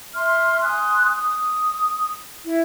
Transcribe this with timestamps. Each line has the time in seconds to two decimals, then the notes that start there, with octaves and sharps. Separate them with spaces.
0.14 E5 C6 F6
0.62 G#5 C6 D#6 F#6
1.15 D#6
2.45 E4